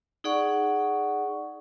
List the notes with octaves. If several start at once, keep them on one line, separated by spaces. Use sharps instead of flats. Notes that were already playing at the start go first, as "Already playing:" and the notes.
D#4 G#4 D5 F#5 C#6